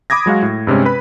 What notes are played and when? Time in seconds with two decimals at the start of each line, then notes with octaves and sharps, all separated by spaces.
0.10 B5 D6 D#6 G#6 A#6
0.26 F#3 G#3 F#4 F5
0.42 A2
0.67 G2 C3 G#3 C#4
0.85 B4 B5